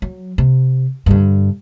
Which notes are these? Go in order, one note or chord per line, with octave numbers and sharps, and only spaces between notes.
F#3
C3
G2 D3